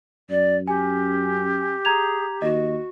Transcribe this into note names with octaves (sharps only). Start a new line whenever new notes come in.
F#2 D5
C#4 G4 G#5
G#4 A#5 G#6 F7
D#2 F#4 D#5